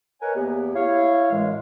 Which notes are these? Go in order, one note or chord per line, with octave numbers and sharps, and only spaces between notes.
A#4 B4 C#5 D#5 F#5 G#5
E2 A#3 B3 G4
E4 C#5 F5
F#2 A2 E3 G#3